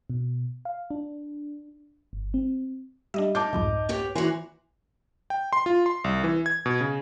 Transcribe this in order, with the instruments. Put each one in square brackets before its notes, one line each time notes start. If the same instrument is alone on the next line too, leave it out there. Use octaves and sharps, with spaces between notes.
[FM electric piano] B2
F5
D4
G1
C4
[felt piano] G3 [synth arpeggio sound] D4 D#5 E5
[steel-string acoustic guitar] D#4 [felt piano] A5 D6 G6
[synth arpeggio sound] C2 F2 G#2
[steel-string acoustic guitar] B3 G4 C#5
[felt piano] E3 [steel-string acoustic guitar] F#4 A#4 C5
[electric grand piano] G5
C6
F4
C6
C2
E3
G#6
B2
C#3